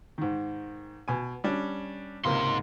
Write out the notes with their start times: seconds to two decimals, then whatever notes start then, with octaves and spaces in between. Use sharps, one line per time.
0.18 G#2 D#3
1.08 B2 G#5
1.44 G3 C#4 D4
2.25 C#2 G#2 C3 A#3 C6